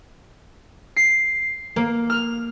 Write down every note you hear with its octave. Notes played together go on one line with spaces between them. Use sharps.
C7
A#3
F6